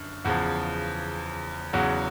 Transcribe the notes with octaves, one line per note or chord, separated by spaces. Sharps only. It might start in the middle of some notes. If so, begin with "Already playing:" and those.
Already playing: F#2 D3
E2 C#3 F3 F#5
E2 C#3 F#3 F#5